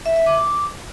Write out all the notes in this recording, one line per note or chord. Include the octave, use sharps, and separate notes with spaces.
E5
E5
D6